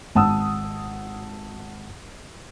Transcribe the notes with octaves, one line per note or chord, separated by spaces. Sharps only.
G#1 F#5 A5 D#6 E6